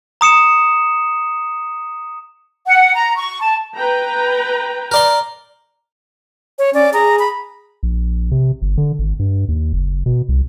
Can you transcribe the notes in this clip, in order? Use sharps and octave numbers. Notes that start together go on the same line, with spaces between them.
A#5 D#6 C#7 E7
F#5
A#5
C#6
A5
B4 G5 A#5
A#4 D5 C6
C#5
C#4 D5
G#4 A#5
B5
A#1
C3
G1
D3
G#1
G2
D#2
F#1
B2
C2